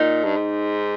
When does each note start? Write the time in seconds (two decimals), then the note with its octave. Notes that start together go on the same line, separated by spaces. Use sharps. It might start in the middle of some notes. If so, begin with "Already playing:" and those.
Already playing: A#2 D#4
0.25 G2
0.36 G#2